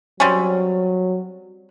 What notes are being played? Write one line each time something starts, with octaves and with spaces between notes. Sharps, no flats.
F#3 G3 C4 C#4